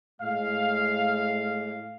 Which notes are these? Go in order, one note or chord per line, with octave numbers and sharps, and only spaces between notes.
A2 G#3 F5